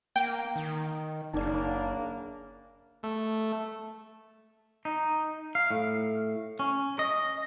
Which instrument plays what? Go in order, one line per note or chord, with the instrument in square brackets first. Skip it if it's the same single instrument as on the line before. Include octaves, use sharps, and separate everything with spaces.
[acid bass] A#3 [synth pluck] G5
[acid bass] D#3
[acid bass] F#1 [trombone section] C#3 A#3 D4 [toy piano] D#4 D5
[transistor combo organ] A3
[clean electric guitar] D#4
F5
A2
C#4
D#5